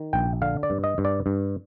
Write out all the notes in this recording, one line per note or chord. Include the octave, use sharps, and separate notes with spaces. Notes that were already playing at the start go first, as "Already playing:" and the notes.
Already playing: D#3
A#1 G5
D3 F5
D5
G2
D#5
G2
D5
G2